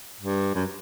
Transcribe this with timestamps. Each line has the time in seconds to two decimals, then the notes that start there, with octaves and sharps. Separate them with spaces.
0.20 G2
0.54 F#2